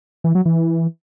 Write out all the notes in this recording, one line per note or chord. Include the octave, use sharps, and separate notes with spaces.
E3
F#3
E3